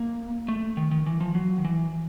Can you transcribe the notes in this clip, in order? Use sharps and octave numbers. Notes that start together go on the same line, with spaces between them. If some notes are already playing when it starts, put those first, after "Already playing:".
Already playing: A#3
A3
D#3
D#3
E3
F3
F#3
D#3
E3